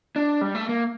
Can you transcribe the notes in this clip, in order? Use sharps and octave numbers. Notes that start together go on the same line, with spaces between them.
D4
G3
A3
A#3